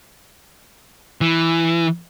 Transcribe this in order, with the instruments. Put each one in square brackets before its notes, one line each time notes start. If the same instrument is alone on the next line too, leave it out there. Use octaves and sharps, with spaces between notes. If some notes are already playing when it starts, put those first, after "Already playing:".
[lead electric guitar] E3